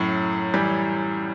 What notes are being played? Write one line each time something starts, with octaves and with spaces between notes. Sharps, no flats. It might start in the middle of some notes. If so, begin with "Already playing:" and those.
Already playing: F#2 A2
E3 G3